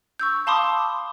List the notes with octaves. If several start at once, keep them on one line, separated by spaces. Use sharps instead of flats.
C#6 E6 G6
F5 A5 B5 C6 D6 D#6